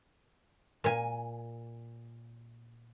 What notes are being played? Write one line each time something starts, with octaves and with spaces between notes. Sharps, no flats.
A#2 G#5